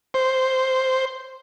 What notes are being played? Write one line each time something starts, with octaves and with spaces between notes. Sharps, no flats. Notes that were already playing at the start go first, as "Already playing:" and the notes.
C5